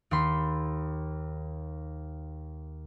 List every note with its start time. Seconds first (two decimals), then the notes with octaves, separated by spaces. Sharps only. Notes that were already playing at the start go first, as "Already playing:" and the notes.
0.11 D#2 B5 C6